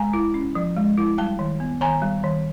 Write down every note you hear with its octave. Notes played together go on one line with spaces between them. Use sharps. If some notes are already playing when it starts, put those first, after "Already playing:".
Already playing: G#3 G#5 A#5
E4
C#4
F3
G#3
E4
G3 G5 A5
D#3
B3
D#3 G#5 A#5
G3
D#3